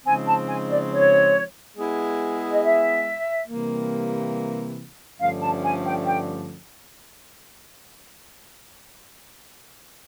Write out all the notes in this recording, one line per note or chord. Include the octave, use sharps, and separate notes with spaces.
C#3 F3 G#3 C4 D#4 G#5
A5
G#5
D5
C#5
G#3 B3 E4 G#4
D#5
E5
C3 E3 G3 A#3
G2 D3 F3 A3 C#4 F5
A5
G#5
G5
G5